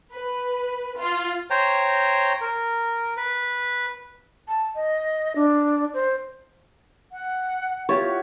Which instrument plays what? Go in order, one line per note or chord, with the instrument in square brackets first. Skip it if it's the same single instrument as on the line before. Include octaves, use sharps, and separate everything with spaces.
[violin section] B4
F4
[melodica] C5 C#5 G5 A#5
A#4
B4
[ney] A5
D#5
D4
C5
[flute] F#5
[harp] E4 F4 G4 [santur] C#5
[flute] F#5